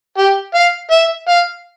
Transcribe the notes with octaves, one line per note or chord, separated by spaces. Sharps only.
G4
F5
E5
F5